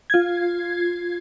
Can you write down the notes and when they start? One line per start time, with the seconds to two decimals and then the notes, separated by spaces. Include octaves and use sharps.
0.10 F4 G#6